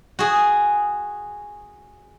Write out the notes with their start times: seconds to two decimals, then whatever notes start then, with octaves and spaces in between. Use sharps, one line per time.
0.19 F#4 G#4